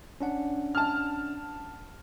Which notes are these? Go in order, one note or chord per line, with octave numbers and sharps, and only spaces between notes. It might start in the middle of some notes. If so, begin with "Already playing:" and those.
C#4 D4 F#5
A5 F6